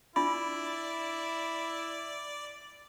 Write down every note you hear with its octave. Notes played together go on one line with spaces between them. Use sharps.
D4 E4 F4 D5 B5